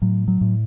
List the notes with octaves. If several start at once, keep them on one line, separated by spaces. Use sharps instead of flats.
A2 F#3
F#3
A2